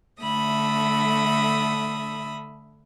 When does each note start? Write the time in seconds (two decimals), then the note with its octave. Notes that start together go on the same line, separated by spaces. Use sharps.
0.22 D3 A3 E5 B5 D#6